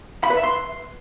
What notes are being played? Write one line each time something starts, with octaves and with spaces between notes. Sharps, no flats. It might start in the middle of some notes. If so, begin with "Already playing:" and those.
B5
B4
E5
C6